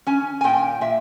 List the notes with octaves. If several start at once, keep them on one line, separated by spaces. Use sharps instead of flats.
C#4 G#5
G#5
A#2 G5
A#2 E5